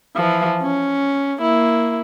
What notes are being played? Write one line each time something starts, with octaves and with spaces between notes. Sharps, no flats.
E3 F3
C#4
A#3 E4